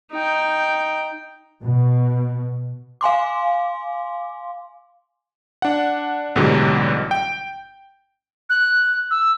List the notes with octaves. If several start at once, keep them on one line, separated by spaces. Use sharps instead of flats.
D#4 G5
B2
F5 G#5 C6 D6
D4 F#5
A1 G#2 B2 D3 F#3 G3
G5
F#6
E6